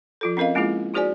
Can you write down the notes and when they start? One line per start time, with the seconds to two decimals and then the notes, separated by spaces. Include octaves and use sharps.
0.21 F3 F4 A4
0.37 C4 C#4 A#4 D#5 F5
0.55 G#3 A#3 C#4 E4 F4 G#4
0.94 D#4 F#4 G#4 C5 D5 G#5